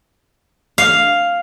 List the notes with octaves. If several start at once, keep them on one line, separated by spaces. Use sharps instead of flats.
F5